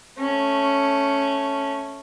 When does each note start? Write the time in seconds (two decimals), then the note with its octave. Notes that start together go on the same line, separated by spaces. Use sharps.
0.19 A3 C#4